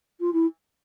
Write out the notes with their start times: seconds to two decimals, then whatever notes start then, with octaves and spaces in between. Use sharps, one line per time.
0.20 F4
0.33 E4